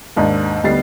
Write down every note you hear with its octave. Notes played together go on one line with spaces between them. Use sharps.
D#2 G#2 D4
D2 G3 B3 D#4 A6 C7